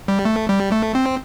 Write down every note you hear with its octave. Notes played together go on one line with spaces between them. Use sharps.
G3
A3
G3
A3
C4